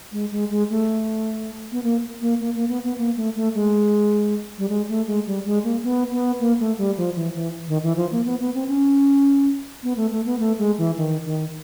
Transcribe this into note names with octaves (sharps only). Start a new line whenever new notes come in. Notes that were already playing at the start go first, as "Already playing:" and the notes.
G#3
G#3
G#3
A3
B3
A#3
A#3
A#3
A#3
B3
B3
A#3
A3
A3
G#3
G3
G#3
A3
G#3
G3
G#3
A#3
B3
B3
A#3
A3
G3
F3
E3
E3
D#3
E3
F3
A#3
B3
B3
C4
C#4
B3
A3
A3
B3
A3
G#3
E3
D#3
D#3